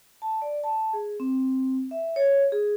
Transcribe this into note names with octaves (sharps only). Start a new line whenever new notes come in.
A5
D5
A5
G#4
C4
E5
C#5
G#4